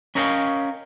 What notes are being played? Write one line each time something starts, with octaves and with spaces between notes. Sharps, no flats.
C#4 A#4 C#5 D#5 F5 G5